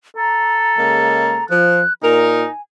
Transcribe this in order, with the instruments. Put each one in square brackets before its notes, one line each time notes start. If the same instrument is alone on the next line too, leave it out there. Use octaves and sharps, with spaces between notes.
[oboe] A4 [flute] A#5
[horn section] C#3 G#3 A#3
[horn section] F3 [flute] F#6
[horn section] A#2 A#4 [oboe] D#4 [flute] G#5